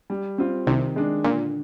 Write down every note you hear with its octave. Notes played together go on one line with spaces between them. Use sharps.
G3
C4 F4
C2 C3 D#3
G#3 D4
A#2 D3